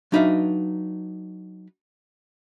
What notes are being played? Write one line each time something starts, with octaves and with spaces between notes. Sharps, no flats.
F#3 D4 D#4 B4 E5 F5